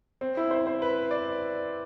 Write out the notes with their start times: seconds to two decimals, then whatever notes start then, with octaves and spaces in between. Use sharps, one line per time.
0.21 C4
0.37 E4
0.51 C5
0.67 C5
0.82 B4
1.11 D5